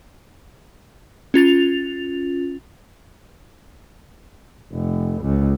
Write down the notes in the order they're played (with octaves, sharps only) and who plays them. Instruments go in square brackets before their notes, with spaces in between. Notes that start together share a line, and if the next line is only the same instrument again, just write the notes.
[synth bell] C#4 F4 A6 F7
[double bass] F1
C#2